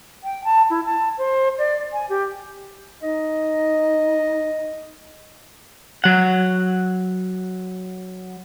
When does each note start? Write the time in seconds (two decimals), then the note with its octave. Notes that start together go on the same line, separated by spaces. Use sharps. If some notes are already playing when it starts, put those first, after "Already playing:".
0.24 G5
0.44 A5
0.70 E4
0.86 A5
1.18 C5
1.58 D5
1.93 G#5
2.09 G4
3.03 D#4 D#5
6.04 F#3 F#5